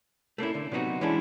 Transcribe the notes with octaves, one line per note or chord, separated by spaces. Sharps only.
A3 A#3 C#4 E4
D3
C3 F#3 B3 D#4 F#4
E3 G#3 C#4 D4 E4